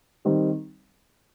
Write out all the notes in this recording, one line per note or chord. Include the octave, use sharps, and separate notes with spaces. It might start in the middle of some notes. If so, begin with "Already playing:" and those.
D#3 G3 C4 D#4